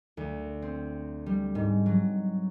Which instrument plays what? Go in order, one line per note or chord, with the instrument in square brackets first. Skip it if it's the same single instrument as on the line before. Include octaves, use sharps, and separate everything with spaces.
[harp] D2
C4
G3
G#2
F#3